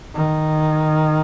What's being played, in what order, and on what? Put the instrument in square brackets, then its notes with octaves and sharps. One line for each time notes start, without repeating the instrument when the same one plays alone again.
[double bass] D#3